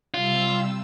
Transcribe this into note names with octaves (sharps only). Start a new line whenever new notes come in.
C3 G3 F4 E6